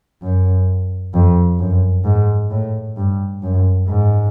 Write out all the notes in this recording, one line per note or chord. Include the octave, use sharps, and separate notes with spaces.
F#2
F2
F#2
G#2
A2
G2
F#2
G#2